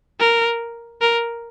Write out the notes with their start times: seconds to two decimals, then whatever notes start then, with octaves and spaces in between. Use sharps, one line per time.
0.20 A#4
1.01 A#4